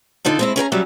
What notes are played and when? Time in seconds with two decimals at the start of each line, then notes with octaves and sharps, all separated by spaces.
0.25 D3 D#4 F4 A4
0.39 G#3 C4 E4
0.56 C#4 G#4 A#4 A#5
0.72 C3 F#3 G3 C#4 E5